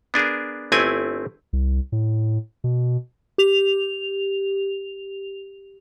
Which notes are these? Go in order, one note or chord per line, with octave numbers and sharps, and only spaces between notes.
B3 D4 G#4 A#4
G1 A3 C4 E4 D5 G#5
C2
A2
B2
G4 F7